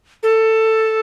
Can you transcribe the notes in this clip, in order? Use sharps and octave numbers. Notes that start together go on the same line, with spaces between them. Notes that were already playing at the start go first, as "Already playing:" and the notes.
A4